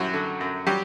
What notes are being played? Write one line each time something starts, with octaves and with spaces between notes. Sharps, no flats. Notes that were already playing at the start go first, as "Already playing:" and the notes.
Already playing: F#2 F#3 G3 E4 F#4
D3
F#2
F#3 G3 G4